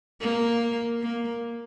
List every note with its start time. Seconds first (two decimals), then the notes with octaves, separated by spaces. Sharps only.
0.20 A#3
1.01 A#3